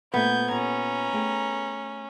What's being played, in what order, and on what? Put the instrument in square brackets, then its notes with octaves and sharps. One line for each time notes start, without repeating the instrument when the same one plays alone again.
[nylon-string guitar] A#2 A3 C4 [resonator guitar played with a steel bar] B3 [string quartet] G6 G#6
[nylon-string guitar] A#2 G4 [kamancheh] C#4 [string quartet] A#5
[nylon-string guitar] A3 G#4 G5